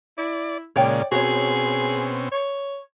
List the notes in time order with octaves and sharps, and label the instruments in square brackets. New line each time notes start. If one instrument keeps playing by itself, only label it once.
[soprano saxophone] E4 [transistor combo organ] D5
[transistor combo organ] A#2 C#3 G#3 [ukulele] C#5 G5 [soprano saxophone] D5
[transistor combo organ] B2 C4 C#4 [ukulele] F#4 C#5 [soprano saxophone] G#4
[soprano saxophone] C#5